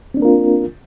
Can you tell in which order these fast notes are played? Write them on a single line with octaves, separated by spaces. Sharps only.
C4 D4 A#3 A#4 F4